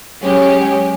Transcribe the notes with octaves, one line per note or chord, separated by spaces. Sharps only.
F#3 G#3 C#4 G4